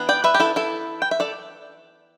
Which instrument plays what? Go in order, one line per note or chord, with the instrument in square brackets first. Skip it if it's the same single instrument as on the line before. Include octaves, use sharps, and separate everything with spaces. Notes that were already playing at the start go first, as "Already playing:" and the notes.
Already playing: [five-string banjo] E3 B3 D4
D5 G5
B4 E5
G4
E4 A4
E4 A4
G5
E5
A4 D5